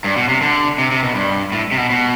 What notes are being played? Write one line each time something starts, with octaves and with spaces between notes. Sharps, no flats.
G2
B2
C3
D3
C3
C3
B2
G2
A2
C3
B2
B2